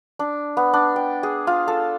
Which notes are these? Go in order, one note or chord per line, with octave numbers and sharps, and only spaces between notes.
D4
B3
D4
G5
G#4
F4
A4